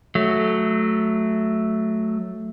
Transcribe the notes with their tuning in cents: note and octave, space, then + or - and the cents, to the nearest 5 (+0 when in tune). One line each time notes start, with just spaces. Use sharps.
F#3 +0 A3 -5